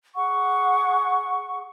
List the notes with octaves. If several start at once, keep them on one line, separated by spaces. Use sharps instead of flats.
G#4 F#5 C#6